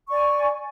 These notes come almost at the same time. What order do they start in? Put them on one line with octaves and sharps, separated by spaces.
C#6 D5 G#5